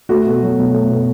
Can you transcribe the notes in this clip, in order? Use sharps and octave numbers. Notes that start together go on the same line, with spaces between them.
A3 F#4
B2
F#3
B2
A3
B2